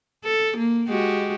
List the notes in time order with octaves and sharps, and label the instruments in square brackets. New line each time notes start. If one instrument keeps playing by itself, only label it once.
[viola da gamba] A4
A#3
G#3 F#4 G4